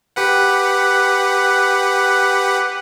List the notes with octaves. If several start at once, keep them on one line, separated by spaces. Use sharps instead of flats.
G4 B4 F#5